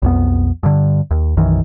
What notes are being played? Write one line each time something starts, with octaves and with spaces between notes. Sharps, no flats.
B1 F2 B3
G2 D3
D#2
B1 F#2 D#3 E3